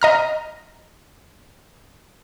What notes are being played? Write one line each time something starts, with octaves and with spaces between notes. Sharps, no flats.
D#5 A#5 F6